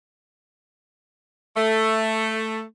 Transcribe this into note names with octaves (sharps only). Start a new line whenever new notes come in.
A3